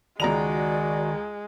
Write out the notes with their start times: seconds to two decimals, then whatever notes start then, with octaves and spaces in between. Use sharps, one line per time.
0.20 C#2 D#3 G#3 F#4 D5 A#5 F7